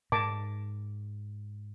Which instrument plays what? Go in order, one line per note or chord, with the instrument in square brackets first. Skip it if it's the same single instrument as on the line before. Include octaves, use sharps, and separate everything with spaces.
[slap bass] G#2 [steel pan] A#4 A5 D6